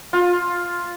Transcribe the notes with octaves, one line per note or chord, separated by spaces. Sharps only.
F4